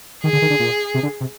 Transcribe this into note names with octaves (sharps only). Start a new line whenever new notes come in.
D#3 G#4
D3
D#3
D3
A#2
C3
D3
C3